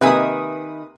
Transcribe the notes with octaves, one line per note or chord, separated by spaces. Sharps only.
C3 D#3 A#3 B4 E5 G#5 D#6